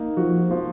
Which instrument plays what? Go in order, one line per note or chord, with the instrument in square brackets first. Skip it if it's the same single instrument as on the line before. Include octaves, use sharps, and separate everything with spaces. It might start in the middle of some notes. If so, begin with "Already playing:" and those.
Already playing: [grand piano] A#3 D#4
[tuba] F3 [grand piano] F#4
[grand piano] F3